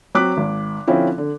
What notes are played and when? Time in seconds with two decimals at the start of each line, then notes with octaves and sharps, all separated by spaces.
0.15 F#3 C4 D6 F#6 B6
0.37 G#1
0.87 D3 F3 C4 C#4 E4
1.18 D3